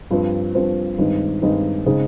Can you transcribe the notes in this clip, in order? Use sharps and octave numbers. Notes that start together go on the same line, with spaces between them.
G2 F3 C4 F4 C5
G2 F3 C4 F4 C5
G2 D#3 G#3 C4 D#4
G2 D#3 G#3 C4 D#4
C#3 G#3 C4 D#4 G#4